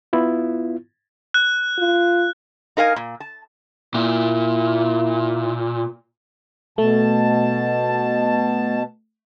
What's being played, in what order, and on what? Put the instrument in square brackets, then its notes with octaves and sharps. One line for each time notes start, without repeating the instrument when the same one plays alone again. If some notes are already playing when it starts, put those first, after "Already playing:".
[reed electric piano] B3 E4 F4
[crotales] F#6
[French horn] F4
[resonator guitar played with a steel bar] D#4 A#4 F5 G#5
A#2
A5
[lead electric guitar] A#2 [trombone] E4
[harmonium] B2 A5 [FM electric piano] A3